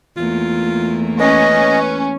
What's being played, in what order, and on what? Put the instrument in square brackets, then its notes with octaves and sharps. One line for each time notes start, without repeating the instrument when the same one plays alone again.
[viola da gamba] E2 A3 A#3 [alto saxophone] F4
[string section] C#4 [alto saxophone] B4 [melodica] D#5